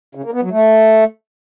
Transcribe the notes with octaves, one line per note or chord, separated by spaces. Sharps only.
C#3
A#3
B3
F#3
A3